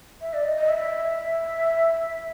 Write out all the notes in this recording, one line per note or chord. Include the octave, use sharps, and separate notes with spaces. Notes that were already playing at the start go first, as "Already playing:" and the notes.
E5
D5
D#5
D#5
E5